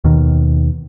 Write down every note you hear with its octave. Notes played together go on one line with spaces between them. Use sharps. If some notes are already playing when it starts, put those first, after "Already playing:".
D#2 B2 D#3